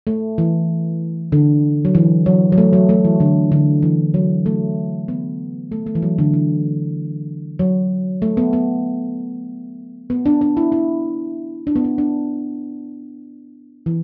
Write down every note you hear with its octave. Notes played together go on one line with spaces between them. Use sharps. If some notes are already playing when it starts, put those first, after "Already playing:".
A3
E3
D3
F#3
E3
F#3
F#3
A3
F#3
A3
E3
D3
D3
E3
F#3
A3
B3
A3
A3
E3
F#3
D3
E3
F#3
A3
B3
B3
B3
D4
D4
E4
E4
D4
B3
D4
D4
E3